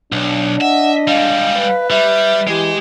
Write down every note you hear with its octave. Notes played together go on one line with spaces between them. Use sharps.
B1 D4
D#5 E5 F#5
G3 G#3 F5
B4
G3 E5
E3 G#3 G4